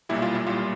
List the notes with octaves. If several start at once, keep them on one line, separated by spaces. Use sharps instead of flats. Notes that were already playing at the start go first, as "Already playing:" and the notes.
B1 A#2 G3 E4
F4
E4
B1 A#2 G3 F4